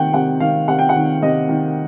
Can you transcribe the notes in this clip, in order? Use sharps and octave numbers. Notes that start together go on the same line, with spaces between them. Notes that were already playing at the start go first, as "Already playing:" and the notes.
Already playing: C3 D#3 F#5 G5
C3 F#5
D#3 F5
C3 F#5
G5
F#5
D#3
C3 D#5
D#3